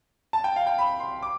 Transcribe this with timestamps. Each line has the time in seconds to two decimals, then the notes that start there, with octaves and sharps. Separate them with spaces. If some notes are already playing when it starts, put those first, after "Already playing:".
0.33 A5
0.44 G5
0.56 F5
0.67 G5
0.78 B5
1.00 C6
1.23 D6